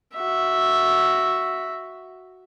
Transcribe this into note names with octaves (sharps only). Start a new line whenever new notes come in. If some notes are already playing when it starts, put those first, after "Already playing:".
F#4 E5